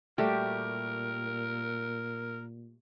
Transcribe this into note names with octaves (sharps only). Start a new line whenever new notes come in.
A#2 G3 A3 F#4 G4 A#4